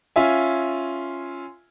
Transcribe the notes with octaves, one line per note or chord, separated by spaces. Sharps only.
C#4 F4 E5 G#5